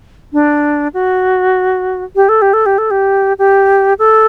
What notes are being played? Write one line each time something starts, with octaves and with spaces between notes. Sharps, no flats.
D4
F#4
G4
A4
G4
A4
G4
A4
G4
G4
A4